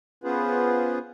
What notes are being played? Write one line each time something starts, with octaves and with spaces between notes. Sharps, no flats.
B3 C#4 F4 G#4 B4 C5